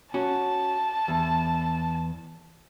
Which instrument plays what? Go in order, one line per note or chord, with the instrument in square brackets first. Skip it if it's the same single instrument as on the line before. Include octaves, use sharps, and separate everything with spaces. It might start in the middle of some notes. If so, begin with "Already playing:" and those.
[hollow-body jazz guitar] C#4 F#4 [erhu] A5
[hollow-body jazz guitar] E2